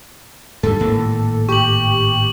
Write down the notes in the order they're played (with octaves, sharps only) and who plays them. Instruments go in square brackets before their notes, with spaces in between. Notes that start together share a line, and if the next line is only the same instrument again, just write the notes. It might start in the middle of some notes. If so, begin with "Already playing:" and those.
[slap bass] G#2 D3 G3 [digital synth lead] A4
[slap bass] G#1 A2 A#3
[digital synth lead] G4 [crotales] C#6 F#7